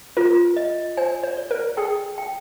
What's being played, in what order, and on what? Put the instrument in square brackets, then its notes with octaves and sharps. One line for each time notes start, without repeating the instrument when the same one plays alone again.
[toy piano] F4 [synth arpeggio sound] A#4
[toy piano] D#5
[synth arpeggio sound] C5 [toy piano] G#5
[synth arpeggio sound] C5
[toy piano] D5
[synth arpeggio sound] A#4
[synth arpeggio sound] G#4 [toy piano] G5
[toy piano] G5